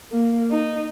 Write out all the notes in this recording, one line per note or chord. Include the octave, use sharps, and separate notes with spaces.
A#3
D#4